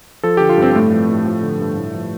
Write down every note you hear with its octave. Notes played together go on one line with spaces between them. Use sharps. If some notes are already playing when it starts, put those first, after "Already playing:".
F3 A4
D3 G4
F4
G2 C4
C4
A2 A3
F3
A2
F3
D3
G2
A2
F3